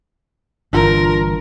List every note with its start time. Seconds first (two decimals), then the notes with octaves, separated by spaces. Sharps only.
0.73 G1 E3 D4 F4 A#4